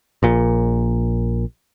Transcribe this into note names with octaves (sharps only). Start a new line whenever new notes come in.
A#1 A#2